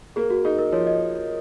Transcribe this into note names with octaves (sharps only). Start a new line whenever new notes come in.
A#3 G#4
F#4
D#4 G#4
A#4
F3 C#5
D#5